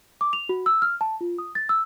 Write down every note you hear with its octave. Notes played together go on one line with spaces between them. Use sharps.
D6
F7
F#4
E6
F6
A5
F4
D#6
A6
E6